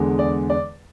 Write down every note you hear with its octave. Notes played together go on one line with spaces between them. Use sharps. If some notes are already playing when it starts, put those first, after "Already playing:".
Already playing: E2 D3 G#3
D5
D5